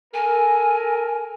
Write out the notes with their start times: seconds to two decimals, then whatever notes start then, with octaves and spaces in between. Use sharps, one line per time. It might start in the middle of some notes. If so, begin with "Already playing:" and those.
0.14 A4 A#4 G#5